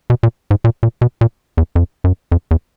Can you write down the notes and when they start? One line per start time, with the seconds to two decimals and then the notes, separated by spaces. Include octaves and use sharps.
0.10 B2
0.23 A#2
0.51 G#2
0.64 A#2
0.83 A#2
1.01 B2
1.21 A#2
1.57 E2
1.75 F2
2.04 F#2
2.32 F2
2.51 E2